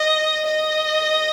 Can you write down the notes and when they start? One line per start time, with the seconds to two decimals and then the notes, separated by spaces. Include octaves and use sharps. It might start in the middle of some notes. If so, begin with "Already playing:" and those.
Already playing: D#5
0.46 D#5